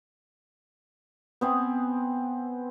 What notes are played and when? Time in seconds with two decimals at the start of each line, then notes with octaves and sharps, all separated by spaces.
1.41 B3 C4 G#5